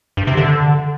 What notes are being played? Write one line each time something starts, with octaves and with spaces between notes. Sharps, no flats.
G2
C3
D3